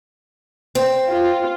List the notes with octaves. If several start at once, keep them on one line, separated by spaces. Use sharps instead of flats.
C4
F4